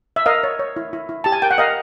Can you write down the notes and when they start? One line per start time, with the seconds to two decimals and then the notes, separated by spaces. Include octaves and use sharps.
0.16 E5
0.26 A#4 D#5 F5
0.44 C#5
0.59 C#5
0.76 E4
0.93 E4
1.09 E4
1.24 G4 A5
1.32 G#5
1.42 A#4 G5
1.51 F#5
1.58 A#4 D#5 F5